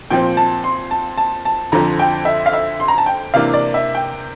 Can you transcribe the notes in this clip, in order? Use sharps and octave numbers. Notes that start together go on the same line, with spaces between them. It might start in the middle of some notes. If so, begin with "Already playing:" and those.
A#2 F3 C4 G5
A5
C6
A5
A5
A5
F2 D3 F3 C4 A#5
G5
E5
F5
E5
C6
A#5
A5
G5
C3 E3 A#3 D4 F5
D5
E5
G5